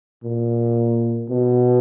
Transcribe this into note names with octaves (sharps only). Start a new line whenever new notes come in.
A#2
B2